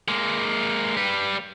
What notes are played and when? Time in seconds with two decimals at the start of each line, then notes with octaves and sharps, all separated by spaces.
0.08 G#3 A#3
0.97 G3 B4